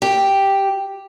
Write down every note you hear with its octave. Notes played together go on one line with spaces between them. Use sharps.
G4